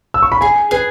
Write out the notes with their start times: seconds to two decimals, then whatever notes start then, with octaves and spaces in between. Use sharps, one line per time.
0.14 E6
0.23 C#6
0.32 B5
0.41 G#4 G#5
0.71 G#4 B4